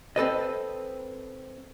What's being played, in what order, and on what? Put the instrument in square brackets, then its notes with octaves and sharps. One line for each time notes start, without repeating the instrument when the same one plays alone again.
[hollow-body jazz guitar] C4 A4 B4 D#5